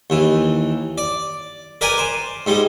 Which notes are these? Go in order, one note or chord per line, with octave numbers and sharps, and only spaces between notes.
D#2 E3
D5
A#4 B4 D5 G5 G#5 A#5
C5
G#2 G3 G#3